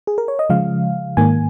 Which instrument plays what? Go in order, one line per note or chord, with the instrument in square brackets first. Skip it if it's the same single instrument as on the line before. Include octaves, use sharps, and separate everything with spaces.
[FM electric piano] G#4
A#4
C#5
D#5
C#3 F3 G#3 F5
G#2 D#3 A#3 G#5